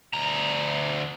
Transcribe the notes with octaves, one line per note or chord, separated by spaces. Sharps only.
D2 A#5